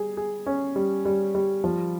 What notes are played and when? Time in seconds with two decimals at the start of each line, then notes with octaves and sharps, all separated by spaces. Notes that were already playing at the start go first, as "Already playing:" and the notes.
Already playing: G3 G#4
0.17 G#4
0.46 C#4
0.76 G3
1.05 G3
1.35 G3
1.64 F3